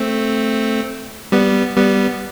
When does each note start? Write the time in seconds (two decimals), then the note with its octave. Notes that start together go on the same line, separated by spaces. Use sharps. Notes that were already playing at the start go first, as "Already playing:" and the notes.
Already playing: A3 C4
1.32 G3 B3
1.76 G3 B3